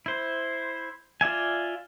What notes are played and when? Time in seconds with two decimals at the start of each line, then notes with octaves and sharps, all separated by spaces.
0.06 E4 C5
1.21 F4 D5 E5 G#5